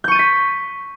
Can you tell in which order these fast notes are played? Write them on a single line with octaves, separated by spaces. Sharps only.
G6 C#6 D#7 A6 B6